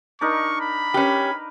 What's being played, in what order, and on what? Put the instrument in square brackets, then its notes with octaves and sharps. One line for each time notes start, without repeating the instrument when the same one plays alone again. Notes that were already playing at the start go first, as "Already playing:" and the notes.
[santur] D4 D#4 A#4 [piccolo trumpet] C#6
[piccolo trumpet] B5
[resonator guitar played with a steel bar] C#4 G4 [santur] A#4 B4